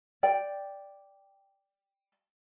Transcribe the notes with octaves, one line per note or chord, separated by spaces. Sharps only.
D5 G5